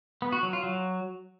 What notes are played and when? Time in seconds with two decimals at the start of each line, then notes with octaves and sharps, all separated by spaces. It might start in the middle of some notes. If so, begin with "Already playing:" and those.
0.22 B3
0.32 F#4
0.43 F#3
0.53 F4
0.63 F#3